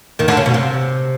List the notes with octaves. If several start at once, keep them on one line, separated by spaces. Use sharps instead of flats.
D#2 D#3
D2 D3
C#3
B2
C3